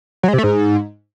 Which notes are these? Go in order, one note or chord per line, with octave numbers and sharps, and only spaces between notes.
F#3
G#3
C3
A3
G#2